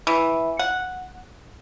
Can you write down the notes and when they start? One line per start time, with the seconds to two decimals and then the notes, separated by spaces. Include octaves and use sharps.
0.07 E3
0.59 F#5